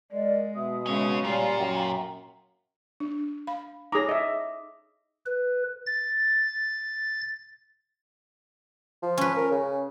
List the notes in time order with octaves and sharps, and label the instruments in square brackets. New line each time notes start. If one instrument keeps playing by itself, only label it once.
[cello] G#3 [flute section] A#4 D5 D#5
[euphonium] B2 [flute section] E5 D#6
[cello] C#3 G#3 [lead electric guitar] C#4 C#5
[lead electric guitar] A#2 [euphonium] G3 [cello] F4 [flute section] C#5 G#5
[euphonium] F#2 [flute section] G5 A#5
[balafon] D4
[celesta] F5 [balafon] B5
[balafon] D#4 C#5 [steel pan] G#4 A#5 [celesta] D6 D#6 A#6
[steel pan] D#5 E5
[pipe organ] B4
A6
[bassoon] F3
[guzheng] C#4 B4
[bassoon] A#4
C#3